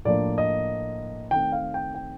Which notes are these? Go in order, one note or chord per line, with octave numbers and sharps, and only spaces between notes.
A2 F3 A#3 D4 D5
D#5
D#3 A3 C4 G5
F5
G5
G5